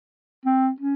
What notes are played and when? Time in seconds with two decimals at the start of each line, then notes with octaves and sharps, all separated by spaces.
0.46 C4
0.80 C#4